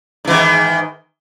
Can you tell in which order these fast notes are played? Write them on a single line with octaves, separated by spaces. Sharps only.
G#2 E3 D#3